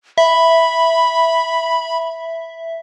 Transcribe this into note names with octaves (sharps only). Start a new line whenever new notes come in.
E5 B5